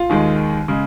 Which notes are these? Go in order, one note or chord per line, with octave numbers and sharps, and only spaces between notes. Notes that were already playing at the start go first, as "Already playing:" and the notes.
Already playing: F4
D#2 D#3 G#3
C#3 G#3